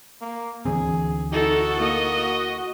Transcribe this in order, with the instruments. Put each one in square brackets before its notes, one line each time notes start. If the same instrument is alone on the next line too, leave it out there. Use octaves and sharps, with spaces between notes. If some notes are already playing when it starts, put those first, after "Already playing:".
[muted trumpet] A#3
[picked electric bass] D2 E3 C4 [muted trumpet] G#4
[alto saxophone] D#4 [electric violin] E4 A4 [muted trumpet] F#4
[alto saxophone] A#3 [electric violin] D#5